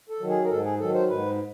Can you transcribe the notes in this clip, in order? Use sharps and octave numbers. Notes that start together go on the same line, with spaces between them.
A4
D#3 F#3
G#4
A#4
G#2 A4
G#4
D#3 F#3 A4
C5
G#2 B4